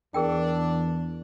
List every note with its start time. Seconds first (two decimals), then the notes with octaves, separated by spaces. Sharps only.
0.14 E2 D4 G#4 A#4 G5